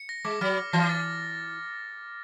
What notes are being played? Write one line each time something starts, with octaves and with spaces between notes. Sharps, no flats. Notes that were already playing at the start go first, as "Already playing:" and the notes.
Already playing: C#7
A#6
G#3 D6
F#3 F6
D6
E3 A#6
A6